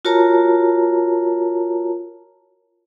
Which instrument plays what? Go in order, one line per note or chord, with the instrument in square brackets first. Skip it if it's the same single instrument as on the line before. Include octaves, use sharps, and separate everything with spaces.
[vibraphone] F4 F#4 A#4 C#5 A5 A#5